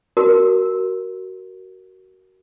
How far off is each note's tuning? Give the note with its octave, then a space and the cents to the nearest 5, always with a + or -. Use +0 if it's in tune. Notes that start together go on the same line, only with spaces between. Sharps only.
F#4 +20 A#4 +0